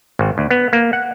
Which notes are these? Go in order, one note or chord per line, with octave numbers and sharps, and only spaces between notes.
G#1
D2
B3
A#3
F#5